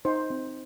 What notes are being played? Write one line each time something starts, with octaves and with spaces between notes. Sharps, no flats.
D#4 C5
C4